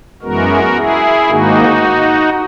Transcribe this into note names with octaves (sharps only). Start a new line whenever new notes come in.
F#2 E3 G#3 B3 F#4 A#4
E4 G#4
G#2 D#3 A#3 D#4 F#4